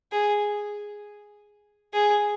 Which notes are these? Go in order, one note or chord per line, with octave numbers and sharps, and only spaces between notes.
G#4
G#4